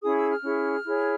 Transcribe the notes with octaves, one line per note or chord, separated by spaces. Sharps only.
C#4 E4 G#4 D#6
E6
F6
C#4 E4 G#4
E4 G#4 C#5